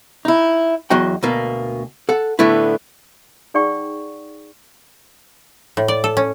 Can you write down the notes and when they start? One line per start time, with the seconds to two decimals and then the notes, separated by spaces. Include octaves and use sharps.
0.25 D#4 E4
0.90 E2 F#3 F#4 D#5 G5
1.23 D2 B2 A#3
2.09 A4 F#5
2.39 A2 D3 A3 B3 E4
3.54 D#4 G#4 D5 F#5 G5 C#6
5.77 A2
5.88 D5
6.04 A4
6.17 C#4